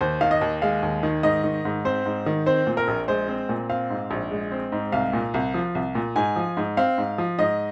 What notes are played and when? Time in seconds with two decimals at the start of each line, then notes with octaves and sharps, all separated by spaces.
0.01 D#2 C5
0.21 D#3 F5
0.31 D#5
0.41 D#2
0.62 G#3 F5
0.83 D#2
1.03 D#3
1.23 G#2 D#5
1.44 D#3
1.65 G#2
1.85 C4 C5
2.06 G#2
2.26 D#3
2.46 C4 C5
2.67 A#2
2.77 A#4
2.88 A#1
3.08 G#3 C5
3.28 C4
3.49 A#2
3.69 C4 F5
3.90 G#2
4.11 A#1
4.31 G#3
4.52 C4
4.72 G#2
4.92 C2 F5
5.13 A#2
5.34 C2
5.54 F3
5.75 C2
5.95 A#2
6.16 G#2 G#5
6.36 F3
6.57 G#2
6.77 C4 F5
6.98 G#2
7.18 F3
7.39 G#2 D#5